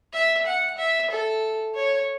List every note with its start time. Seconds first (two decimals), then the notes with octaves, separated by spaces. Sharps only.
0.14 E5
0.46 F#5
0.78 E5
1.11 A4
1.75 C#5